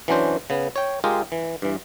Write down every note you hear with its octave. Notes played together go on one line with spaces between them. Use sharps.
E3 F#3 C#4 D4 C5
C#3 B3
C#5 G5
G#3 F4 G4 G#4 A#4
E3
G2 E3